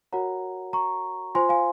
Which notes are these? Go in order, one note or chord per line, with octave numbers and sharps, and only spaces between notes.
F#4 A#4 C#5 F#5 A#5
A#5 C#6
F4 C5 G#5 C6
F5 G#5